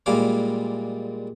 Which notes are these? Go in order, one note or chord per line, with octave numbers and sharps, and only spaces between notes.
A#2 G3 G#3 E4 F5 D6